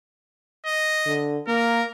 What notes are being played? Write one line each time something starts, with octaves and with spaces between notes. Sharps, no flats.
D#5
D3
A#3 A#4